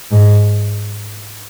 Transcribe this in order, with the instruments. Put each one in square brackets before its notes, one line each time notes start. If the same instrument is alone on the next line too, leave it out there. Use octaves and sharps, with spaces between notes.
[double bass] G#2